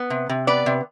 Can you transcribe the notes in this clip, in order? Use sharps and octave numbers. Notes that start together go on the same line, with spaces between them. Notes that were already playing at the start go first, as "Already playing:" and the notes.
Already playing: B3
C3
C3
B3 B4 D5
C3